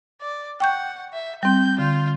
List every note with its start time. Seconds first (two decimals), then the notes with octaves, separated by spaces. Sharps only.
0.21 D5
0.60 F#5 G5 C#6 G6
1.13 E5
1.43 G3 C4 G6
1.78 D3 F4